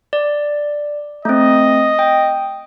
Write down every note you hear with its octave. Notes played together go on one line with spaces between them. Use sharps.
D5
A3 C4 D#5
G5